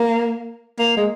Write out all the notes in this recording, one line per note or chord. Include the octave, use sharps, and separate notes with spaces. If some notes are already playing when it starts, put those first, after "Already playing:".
Already playing: A#3
A#3
G#3